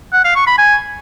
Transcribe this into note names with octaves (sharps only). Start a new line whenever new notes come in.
F#5
F5
C#6
B5
G#5